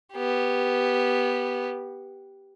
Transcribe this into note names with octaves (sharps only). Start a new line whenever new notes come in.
B3 G4